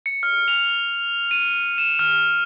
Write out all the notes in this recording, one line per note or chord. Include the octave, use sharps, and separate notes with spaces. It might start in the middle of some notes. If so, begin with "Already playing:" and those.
C#7
F6
F7
D#7
E7
F6